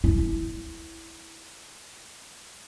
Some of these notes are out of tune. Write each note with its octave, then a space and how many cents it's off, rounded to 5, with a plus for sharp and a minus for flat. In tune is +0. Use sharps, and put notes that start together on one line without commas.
E4 -5